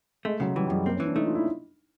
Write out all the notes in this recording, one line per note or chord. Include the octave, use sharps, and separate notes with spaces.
G#3 A3
C#3 F#3
E3 G3
G3
F#2 G#3
A#3 C4
C#4
E3
D4
A3 D#4
F4
E4